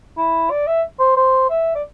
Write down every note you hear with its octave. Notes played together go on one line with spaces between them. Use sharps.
E4
D5
E5
C5
C5
E5
D5